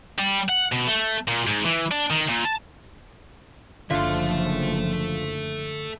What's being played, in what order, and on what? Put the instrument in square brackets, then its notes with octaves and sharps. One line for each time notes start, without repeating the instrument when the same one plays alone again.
[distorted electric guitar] G3
F#5
B2
A3
A#2
G#2
E3
D4
D#3
A#2
A5
[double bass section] F#1 F3 [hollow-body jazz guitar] D3 [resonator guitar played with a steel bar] F4 [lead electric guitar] A4 E5